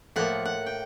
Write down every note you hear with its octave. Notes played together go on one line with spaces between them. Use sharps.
A2 F3 A#3 F#5
F#5
G5